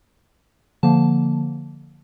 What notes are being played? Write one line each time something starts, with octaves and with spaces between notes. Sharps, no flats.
D3 F3 A#3 A5